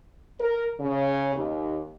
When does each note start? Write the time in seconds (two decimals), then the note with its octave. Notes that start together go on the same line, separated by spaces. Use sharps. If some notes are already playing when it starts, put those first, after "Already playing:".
0.40 A#4
0.80 C#3
1.35 D#2